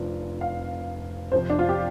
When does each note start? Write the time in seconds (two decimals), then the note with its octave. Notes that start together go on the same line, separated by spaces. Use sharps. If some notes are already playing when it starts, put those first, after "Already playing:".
Already playing: F1 F2 F3 D4 F4
0.41 F5
1.32 F2 C3 F3 C5
1.50 D4
1.59 F4
1.69 G4